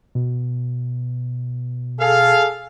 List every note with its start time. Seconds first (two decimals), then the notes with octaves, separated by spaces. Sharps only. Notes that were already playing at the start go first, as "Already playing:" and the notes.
0.15 B2
2.00 G#4 A4 F5